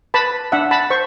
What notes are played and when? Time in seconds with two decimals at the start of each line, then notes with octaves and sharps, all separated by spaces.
0.14 B4 A5 B5
0.52 D4 E5 F#5
0.71 A5 B5
0.90 C5 C#6